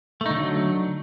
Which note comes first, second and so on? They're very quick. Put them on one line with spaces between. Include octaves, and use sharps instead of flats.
A3 D#4 D3 F#3